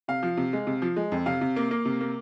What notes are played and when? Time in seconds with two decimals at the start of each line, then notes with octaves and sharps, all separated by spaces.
0.08 C3 F5
0.23 F3
0.37 C3
0.53 G#3
0.67 C3
0.82 F3
0.96 G#3
1.12 F2
1.26 C3 F5
1.41 C3
1.56 A#3
1.71 A#3
1.85 C3
2.01 A#3